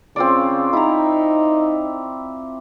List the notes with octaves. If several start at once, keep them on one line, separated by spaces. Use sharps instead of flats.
C#3 C4 F4 D5
D#4 E4 A#5